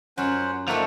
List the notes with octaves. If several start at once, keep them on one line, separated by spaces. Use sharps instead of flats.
F#2 C#4 F4 C5 F#5
F3 A3 A#3 D4 D#4 A4 F#5